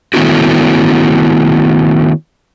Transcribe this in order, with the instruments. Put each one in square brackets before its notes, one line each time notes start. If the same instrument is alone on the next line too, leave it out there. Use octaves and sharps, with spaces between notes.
[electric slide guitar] D#3 A3 B3 C#4 E4 F#4